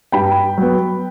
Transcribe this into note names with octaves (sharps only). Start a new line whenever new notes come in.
G2 G5 B5
F#3 B3